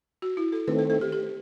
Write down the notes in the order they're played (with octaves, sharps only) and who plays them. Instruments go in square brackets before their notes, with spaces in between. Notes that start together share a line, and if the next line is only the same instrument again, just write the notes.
[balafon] F#4
E4
A4
[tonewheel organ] D#3 A3 C4 [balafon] B4
[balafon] A4
A4
G4
G4